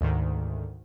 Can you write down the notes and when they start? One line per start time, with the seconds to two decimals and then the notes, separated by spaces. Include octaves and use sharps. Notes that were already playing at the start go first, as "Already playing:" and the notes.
0.01 D2 G#2 D#3